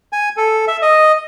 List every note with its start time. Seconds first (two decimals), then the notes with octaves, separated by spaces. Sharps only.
0.13 G#5
0.37 A4
0.68 E5
0.82 D#5